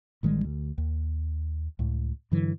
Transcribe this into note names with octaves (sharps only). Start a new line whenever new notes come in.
A1 D#3 G3 G#3
D2
D#2
C#2 A2
G2 D3 E3 F#3